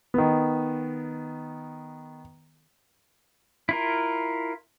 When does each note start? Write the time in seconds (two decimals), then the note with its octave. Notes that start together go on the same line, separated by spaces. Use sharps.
0.14 D#3 B3
3.69 E4 F4 A#4